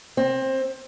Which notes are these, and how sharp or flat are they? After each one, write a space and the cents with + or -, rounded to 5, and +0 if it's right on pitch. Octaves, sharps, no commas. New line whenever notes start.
C4 +20